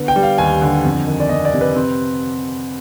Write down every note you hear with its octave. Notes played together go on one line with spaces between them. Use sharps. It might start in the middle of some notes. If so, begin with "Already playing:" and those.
Already playing: D3 B3
G5
G3
F5
D#2 G#5
D3
F2
D#3
D5
F2 D#5
D5
C3
B4
C4